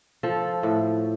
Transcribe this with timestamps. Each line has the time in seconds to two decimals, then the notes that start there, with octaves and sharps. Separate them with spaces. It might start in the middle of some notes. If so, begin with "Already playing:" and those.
0.23 F3 A4
0.63 A2